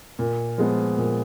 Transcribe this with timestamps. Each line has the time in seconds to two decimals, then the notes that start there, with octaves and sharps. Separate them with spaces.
0.19 A#2
0.58 F3 G#3 B3
0.98 A#2